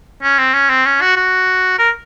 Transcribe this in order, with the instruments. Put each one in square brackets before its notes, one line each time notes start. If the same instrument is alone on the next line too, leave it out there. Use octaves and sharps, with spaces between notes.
[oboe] C#4
C4
C#4
C4
C#4
F#4
F#4
A#4